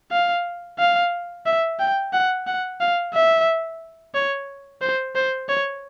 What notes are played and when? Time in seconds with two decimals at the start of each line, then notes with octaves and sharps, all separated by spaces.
0.12 F5
0.79 F5
1.46 E5
1.79 G5
2.13 F#5
2.47 F#5
2.80 F5
3.14 E5
4.15 C#5
4.82 C5
5.15 C5
5.49 C#5